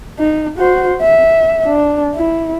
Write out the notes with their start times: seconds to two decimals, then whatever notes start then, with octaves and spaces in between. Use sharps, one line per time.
0.19 D#4
0.58 F#4 C5
1.01 E5
1.66 D4
2.15 E4